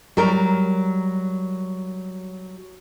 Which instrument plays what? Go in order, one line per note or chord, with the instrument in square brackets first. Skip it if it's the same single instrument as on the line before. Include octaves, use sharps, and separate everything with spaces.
[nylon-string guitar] F#3 G3 A#4